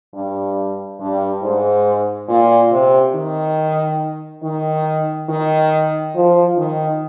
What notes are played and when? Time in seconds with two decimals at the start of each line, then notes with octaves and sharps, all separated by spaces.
0.14 G2
1.00 G2
1.42 G#2
2.28 A#2
2.71 C3
3.14 D#3
4.43 D#3
5.29 D#3
6.14 F3
6.57 D#3